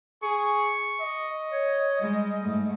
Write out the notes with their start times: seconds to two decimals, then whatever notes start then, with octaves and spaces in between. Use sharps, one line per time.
0.23 G#4 C#6
1.00 D#5
1.52 C#5
2.01 G3 G#3
2.41 G#2 A3